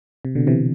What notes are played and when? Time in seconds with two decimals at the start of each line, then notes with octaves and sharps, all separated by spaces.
0.25 C3
0.35 B2 D3
0.47 C3 E3